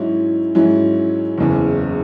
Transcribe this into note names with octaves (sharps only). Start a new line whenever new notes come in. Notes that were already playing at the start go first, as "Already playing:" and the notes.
Already playing: G#2 F#3 C#4 E4
G#2 F#3 C#4 E4
F#1 E2 C#3